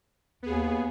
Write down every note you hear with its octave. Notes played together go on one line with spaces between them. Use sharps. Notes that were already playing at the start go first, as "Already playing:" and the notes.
D#2 B3 G#4